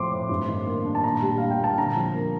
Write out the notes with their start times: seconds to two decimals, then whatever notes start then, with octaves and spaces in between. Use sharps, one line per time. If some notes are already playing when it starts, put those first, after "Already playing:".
Already playing: A2 F3 C4 C6 D6
0.11 A2
0.29 G2
0.48 D#3
0.66 A#3
0.85 D4
0.95 A5
1.04 A#2 A#5
1.22 G3
1.38 D4 F5
1.51 G5
1.59 A#2 A5
1.78 D3 A#5
1.96 F3
2.14 A#3